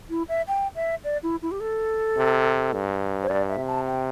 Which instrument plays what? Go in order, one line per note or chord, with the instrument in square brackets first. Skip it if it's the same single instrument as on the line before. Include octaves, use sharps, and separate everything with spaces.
[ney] E4
E5
G5
E5
D5
E4
E4
G4
A4
[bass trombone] C3
G2
[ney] C5
[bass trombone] G2 [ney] D5
[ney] E5
[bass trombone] C3
[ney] A5
G5